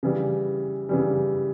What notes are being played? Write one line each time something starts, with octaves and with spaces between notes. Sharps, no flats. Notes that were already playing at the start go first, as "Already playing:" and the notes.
C#3 E3 G3
C#3 E3 G3